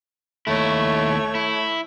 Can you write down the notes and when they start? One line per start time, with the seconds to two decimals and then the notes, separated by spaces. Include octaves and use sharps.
0.47 D#2 A3 E4 C#5
1.35 E4